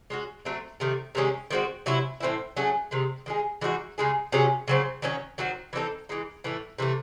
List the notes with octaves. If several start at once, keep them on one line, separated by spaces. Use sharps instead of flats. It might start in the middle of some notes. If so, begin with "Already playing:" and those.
G#3 C#4 F#4
F#3 A3 C4
C3 D#3 A3
C3 D#3 G#3 C#4
D#3 G#3 C4 F#4
C3 F#3 C#4 E4
A2 E3 C4 E4
F#3 A3 C#4 G#4
C3 D#3 G#3
D#3 G#3 D#4 G#4
E3 G#3 D#4 F#4
C#3 G#3 D#4 G#4
C3 F#3 C#4 G#4
C#3 F#3 C4
D#3 F#3 C#4
D#3 F#3 C4 F#4
E3 C4 D#4 A4
E3 G#3 D#4
A2 E3 A3
C3 E3 A3